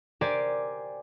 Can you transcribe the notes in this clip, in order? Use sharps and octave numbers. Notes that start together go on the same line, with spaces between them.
G4 A#4 C5 D5 G#5